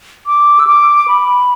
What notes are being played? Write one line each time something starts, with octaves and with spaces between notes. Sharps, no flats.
D6
E6
D6
B5